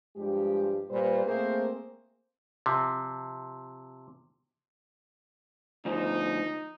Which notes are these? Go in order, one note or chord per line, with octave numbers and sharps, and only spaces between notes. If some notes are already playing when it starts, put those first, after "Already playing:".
G2 F3 G#3 G4
A#2 G3 B4 C5
A3 A#3 C4 G#4 C5
C3 F3
D2 F3 D#4